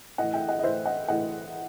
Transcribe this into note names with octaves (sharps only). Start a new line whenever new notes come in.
A2 E3 D#5 F#5
E5 G5
D#5 F#5
D#5
A2 E3 C5 E5
D#5 F#5
A2 E3 D#5 F#5